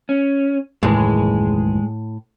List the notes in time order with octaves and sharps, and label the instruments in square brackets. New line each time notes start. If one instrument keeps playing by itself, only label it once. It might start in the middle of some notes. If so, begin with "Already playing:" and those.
[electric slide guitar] C#4
[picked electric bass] F#1 D#2 E3 [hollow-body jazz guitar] A2 [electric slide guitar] G#3 G#4